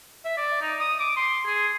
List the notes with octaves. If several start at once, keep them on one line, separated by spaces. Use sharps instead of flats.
E5
D5
D#4
D#6
D6
C6
G#4